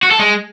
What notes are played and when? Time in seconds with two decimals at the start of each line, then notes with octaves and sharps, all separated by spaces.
0.03 F#4
0.11 A4
0.19 G#3